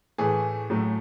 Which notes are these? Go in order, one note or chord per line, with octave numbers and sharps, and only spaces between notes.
A2 E3 A3 G#4
A2 F#3 A3